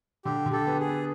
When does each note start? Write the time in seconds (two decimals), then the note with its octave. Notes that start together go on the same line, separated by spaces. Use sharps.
0.25 D3 G4
0.46 D3
0.52 G4 A4
0.67 B3
0.80 G#4
0.88 B3